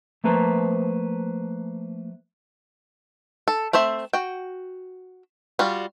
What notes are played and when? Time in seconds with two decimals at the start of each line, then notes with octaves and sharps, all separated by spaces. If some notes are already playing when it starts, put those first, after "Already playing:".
0.24 F3 A3 A#3 B4 C5
3.48 A4
3.73 A3 C4 C5 E5
4.13 F#4 G5
5.59 G3 F4 F#4